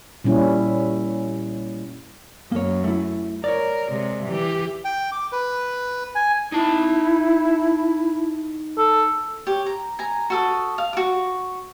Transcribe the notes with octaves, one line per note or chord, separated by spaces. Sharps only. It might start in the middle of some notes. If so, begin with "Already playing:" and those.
A#2 G3 C#4 E4
F#2 A#3 C#5
A3 E4
A#4 C#5 D5
C3 G#3
E3 G4
G5
D6
B4
G#5
D#4 E4 A5
A4
G4 C#5
A#5
G#5 A#5
F#4 A4 D#6
F5
F#4 D6